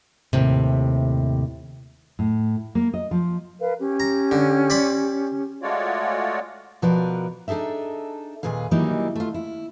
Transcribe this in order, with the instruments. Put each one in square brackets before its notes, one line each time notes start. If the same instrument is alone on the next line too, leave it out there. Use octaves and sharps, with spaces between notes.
[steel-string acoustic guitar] D#2 A2 C3
[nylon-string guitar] A2
A#3
D#5
F3
[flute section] A#4 B4 F5
C#4 G4
[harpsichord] A#5
D3
D5 B5 C6
[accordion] G#3 A3 F4 F#4 C#5 D5
[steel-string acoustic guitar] B2 F3 F#4 A#4 B4 D5
D4 D#4 G#4 A4 E5
D#2 A#2 G#4 B4 F5
D#3 E3 F#3 G3 A#3 D#4
A3 F4
E4